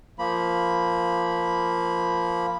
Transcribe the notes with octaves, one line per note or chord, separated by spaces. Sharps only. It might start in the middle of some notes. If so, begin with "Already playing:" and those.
F3 A#3 B5